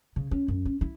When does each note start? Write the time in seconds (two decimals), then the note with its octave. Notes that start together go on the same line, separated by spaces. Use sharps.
0.16 C#3
0.31 C#4
0.48 F#2
0.65 C#4
0.81 E4